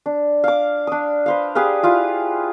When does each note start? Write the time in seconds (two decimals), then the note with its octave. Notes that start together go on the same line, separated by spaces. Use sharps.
0.06 D4
0.44 F5 D6
0.87 D4 D#6
1.26 B4 C5 F5
1.55 G4 G#4 B4 F5
1.83 E4 F4 F5